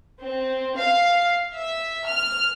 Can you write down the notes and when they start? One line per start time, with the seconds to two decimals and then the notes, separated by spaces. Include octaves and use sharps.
0.19 C4
0.76 F5
1.52 E5
2.07 F6